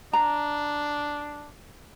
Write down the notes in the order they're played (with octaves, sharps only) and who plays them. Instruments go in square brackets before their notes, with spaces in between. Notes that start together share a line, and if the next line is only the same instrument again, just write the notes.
[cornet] D4 [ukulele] A#5